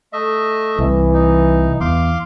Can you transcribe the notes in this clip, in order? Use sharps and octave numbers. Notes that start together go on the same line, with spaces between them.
A3 D#5 E5
C2 E3
D#4
E2 F5 C6 D6